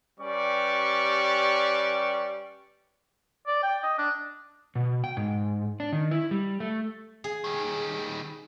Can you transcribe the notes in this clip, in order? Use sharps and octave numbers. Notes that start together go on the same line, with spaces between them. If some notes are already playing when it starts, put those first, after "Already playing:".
G3 C#4 G4 B4 D5 C#6
D5
G5
D#5
D4
B2
G5
G#2
D4
D#3
E4
G3
A3
G#4
D#3 G3